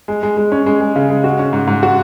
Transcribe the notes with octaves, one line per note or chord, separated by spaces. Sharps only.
G#3
G#3
G#3
C#4
G#3
G#3
C#3
G#3
F#4
C#4
G#2
G#2
F#4